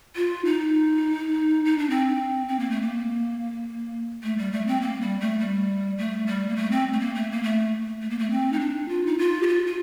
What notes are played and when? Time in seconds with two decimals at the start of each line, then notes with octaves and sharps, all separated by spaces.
0.16 F4
0.45 D#4
1.65 D#4
1.78 D4
1.90 C4
2.48 C4
2.60 A#3
2.70 A3
2.82 A#3
4.23 A3
4.38 G3
4.52 A3
4.67 C4
4.81 A#3
5.01 G3
5.20 A3
5.40 G3
5.98 A3
6.27 G3
6.49 A#3
6.56 A3
6.71 C4
6.93 A3
7.00 A#3
7.15 A3
7.31 A#3
7.43 A3
8.02 A3
8.10 A#3
8.19 A3
8.31 C4
8.53 D#4
8.60 D4
8.89 F4
9.06 D#4
9.18 F4
9.42 G4
9.47 F4
9.67 F4